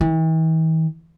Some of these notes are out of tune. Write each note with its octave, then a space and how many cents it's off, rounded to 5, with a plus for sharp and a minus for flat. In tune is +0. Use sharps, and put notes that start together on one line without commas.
E3 -45